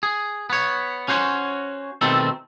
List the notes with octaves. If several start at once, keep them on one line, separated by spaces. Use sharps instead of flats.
G#4
B3 C#5
C#4 F#4 C5 C#5
B2 D#3 G3 A3 C4 A4